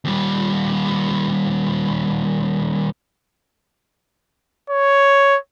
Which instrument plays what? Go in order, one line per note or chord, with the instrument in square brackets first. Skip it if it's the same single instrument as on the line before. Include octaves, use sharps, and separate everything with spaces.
[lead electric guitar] D#2 G3
[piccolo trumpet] C#5